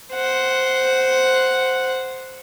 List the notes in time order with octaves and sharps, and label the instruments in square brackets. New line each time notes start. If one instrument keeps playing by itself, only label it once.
[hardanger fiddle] C5 F#5